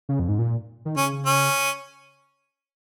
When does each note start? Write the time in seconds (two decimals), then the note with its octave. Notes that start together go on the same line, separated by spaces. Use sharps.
0.09 C#3
0.20 F2
0.29 G#2
0.39 A#2
0.85 D#3
0.96 C#3 C#4
1.26 C#4